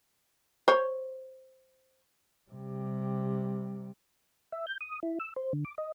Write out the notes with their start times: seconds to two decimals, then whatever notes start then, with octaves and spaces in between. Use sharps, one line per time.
0.68 C5 C#5
2.50 C3 G3
4.52 E5
4.67 G6
4.81 D#6
5.03 E4
5.20 E6
5.36 C5
5.53 D3
5.65 D6
5.78 D#5